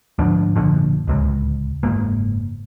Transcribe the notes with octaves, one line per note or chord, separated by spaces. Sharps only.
D2 G#2 F3 D4
F#1 A#2 D3 F3
D1 C#2
F#1 G#2 A#3